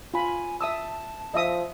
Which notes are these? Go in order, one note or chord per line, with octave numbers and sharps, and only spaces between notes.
F4 G#5 B5
E5 A5 D#6 E6
F3 D#5 E5 D#6